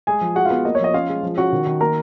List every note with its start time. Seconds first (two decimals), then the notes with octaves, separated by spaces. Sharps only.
0.07 G#3 G#4 G#5
0.21 F3
0.35 G#3 F#4 F#5
0.45 F4 F5
0.50 B3
0.65 A#3 D#5
0.75 C#5
0.80 F3 D#5
0.93 C#4 F4 F5
1.09 G#3
1.23 F3
1.37 C#4 F#4 F#5
1.52 D#3
1.66 D#3
1.81 A#3 A#4 A#5